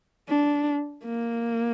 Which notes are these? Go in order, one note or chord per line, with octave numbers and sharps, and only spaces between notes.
D4
A#3